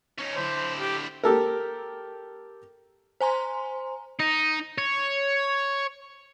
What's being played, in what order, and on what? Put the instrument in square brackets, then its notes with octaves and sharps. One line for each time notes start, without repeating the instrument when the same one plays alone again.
[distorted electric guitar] C#4 D#4
[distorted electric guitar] D3 E4 [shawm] C5
[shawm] G4
[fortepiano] G4 A4 A#4
[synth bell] C5 G#5 A#5 C6
[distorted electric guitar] D#4
C#5